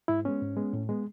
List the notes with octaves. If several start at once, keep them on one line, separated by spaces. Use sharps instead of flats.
G#2 E4
G#3 B3 C#4
G#2
G#3 B3
A2
G#3 B3